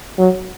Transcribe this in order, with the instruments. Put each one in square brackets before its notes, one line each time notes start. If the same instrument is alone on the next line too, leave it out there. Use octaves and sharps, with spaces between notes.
[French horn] F#3